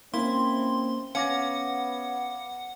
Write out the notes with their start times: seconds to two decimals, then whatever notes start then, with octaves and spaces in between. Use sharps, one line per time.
0.14 A#3 C4 C#4 E4 C6
1.15 B3 C#4 F5 F#5 D6 A#6